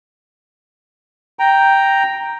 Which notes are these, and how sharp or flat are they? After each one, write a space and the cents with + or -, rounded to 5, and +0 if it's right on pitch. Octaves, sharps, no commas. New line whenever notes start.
G5 +0 A#5 +0